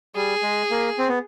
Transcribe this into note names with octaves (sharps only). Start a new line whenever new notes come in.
G3 G#4
G#3
A#3
C4
B3